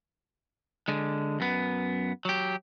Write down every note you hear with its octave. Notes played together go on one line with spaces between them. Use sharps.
D3 G#3
F#2 B3
F#3 G4